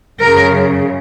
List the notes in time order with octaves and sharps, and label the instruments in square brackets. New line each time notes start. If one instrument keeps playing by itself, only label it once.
[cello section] F#2 C#3 A#4